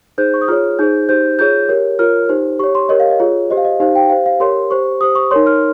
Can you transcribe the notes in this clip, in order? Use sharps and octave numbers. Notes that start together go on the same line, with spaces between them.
D#4 G#4 C5 G6
C#6
D#6
F4 G#4 C#5 F6
D#4 G#4 C5 G6
D#4 G4 C5 G6
F4 G#4 C#5 G6
G4 A#4 C#5
F4 A#4 C#5 F6
D#4 G4 C5
G4 C#5 C#6
C6
G4 A#4 C#5 D#5
F5
D#5
F4 G#4 C#5
G4 C5 D#5
F5
D#5
D#4 G4 C5 F5
G5
G4 C5 F5
F5
G4 A#4 C#5 C6
G4 C5 C#6
G4 C5 D#6
C#6
D#4 A#4 C#5 C6
F6